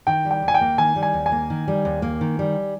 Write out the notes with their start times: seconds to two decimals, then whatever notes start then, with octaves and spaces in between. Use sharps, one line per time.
0.07 D#3 G5
0.25 G3
0.31 G5
0.42 D#2
0.48 G#5
0.54 G5
0.61 A#3
0.78 D#3 G#5
0.96 G3
1.03 G#5
1.14 D#2
1.26 G#5
1.32 A#3
1.50 D#3
1.68 G3
1.85 D#2
2.02 A#3
2.21 D#3
2.39 G3